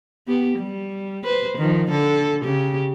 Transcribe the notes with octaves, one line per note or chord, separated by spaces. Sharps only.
B3 G4
G3
B4 C5
D#3 F3
D3 A4
C#3 G4